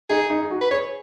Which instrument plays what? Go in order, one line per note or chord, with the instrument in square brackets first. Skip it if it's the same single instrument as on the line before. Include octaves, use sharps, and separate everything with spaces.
[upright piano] D#4 [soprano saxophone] G#4
[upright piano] D#4
G#4
F#4
[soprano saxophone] B4
[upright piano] G#4 [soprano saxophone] C#5